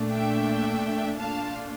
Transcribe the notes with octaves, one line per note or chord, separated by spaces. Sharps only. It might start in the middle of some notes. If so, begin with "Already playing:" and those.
Already playing: A#2 A3 D4
E5 G5
A#2 A3 D4 F4 F5 A5